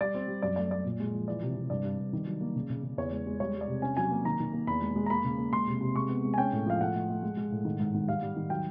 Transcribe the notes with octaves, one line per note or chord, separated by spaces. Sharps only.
G3 D5
C4
G3
F#2 D5
A3 D5
A3 D5
A#2
G#3
F3
E3 D5
C3
C3
G2 D5
G2
G2
D#3
F#3
A#3
C#3
C#3
C#3
E2 C#5
G#3
G#3
G3 C#5
G3
D5
C3
C#4 G#5
F#3 G#5
A#3
D#3 A#5
D#3
A#3
E2 B5
G#3
G#3
A#5
A#3 B5
C#3
A#3
G#3 C6
C3
C3
G#3 C#6
B3
G#3
G#5
C#4 G5
A2
F3 F5
A3 F#5
A3
A3
G#3
G#3
A2
D#3
G#2
D#3
G3 F5
G3
D#3
F#3 G5